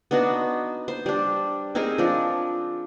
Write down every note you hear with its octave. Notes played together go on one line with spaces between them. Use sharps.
B3 D4 D#4 F#4
C5
G3 D4
C4 D#4 G#4 A#4
F3 D4